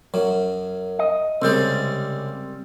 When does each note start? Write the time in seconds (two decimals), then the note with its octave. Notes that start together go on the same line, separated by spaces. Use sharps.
0.14 F#2 F#3
0.99 D#5
1.42 C2 C#3 G3 G#3 C4